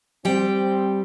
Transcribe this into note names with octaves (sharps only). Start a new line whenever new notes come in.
G3 C4 G5